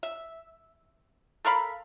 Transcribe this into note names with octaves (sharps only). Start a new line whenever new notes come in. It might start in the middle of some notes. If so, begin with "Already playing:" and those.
E5
A4 A#4 F5 B5